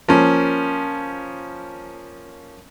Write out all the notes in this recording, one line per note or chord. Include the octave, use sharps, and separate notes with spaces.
F3 A#3 C#4